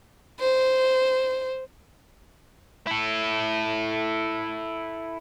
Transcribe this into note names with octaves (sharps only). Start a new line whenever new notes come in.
C5
E4 A4